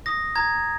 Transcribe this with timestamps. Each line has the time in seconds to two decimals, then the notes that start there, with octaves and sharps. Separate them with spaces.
0.06 D#6 A#6
0.36 A#5 G#6